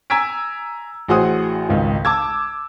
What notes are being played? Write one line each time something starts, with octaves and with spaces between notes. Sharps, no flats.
G#5 A#5 E6 G#6 B6 D7
A1 F#4 G#4 C5 F#5 D#6
G#1 C#2 D#3
A5 D6 E6 G#6